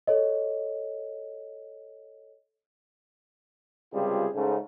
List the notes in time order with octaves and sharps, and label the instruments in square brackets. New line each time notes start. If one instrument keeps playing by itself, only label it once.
[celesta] A4 C#5 D#5
[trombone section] C#2 C3 G3 C4 F4 G#4
G#2 C#3 A3